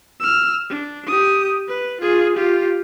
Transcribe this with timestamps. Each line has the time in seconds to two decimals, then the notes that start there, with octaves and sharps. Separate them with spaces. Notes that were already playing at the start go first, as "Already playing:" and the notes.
0.20 E6 F6
0.70 D4
1.06 G4 D#6
1.68 B4
2.01 F4 G#4
2.36 F4 G4